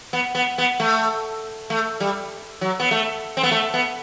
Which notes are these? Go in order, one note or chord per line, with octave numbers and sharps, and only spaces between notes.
B3
B3
B3
A3
A3
G3
F#3
B3
A3
C4
B3
A3
B3